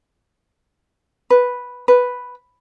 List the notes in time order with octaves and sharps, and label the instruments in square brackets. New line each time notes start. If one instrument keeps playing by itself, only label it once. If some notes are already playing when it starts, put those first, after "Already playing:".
[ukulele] B4
B4